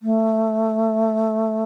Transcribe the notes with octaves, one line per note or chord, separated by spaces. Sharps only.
A3